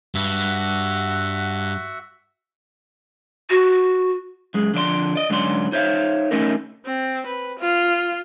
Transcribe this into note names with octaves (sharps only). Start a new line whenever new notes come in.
G2 F#4 E5 F#5
F#4
F#2 G#3
D3 F3 D5 C6
D5 D#5
G#2 D3 F#3 C#4 D5 C6
D#4 C5 C#5 E5 F5
A3 B3 C#4 D#4 A4 A#4
C4
B4
F4